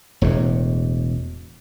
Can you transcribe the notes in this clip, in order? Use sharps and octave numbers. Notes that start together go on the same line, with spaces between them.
E1 E2 A2